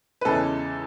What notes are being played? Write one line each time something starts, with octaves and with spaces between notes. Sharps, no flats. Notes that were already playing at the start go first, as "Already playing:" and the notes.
B4
E2 C#3 E3 G#3 A4